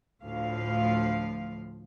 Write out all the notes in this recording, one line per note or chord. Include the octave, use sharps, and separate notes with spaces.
D2 A2 F3 F5